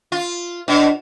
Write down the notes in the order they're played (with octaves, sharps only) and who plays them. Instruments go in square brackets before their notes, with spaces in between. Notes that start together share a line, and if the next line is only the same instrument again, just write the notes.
[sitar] F4
[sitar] B2 [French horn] D4